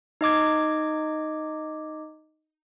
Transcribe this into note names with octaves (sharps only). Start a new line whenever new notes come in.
D#4 D#5 D6 G#6